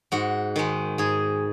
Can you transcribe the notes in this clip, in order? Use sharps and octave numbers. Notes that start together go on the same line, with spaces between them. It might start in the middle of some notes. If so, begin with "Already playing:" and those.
G#2 F#4
D#3 G#3
G#2 G#4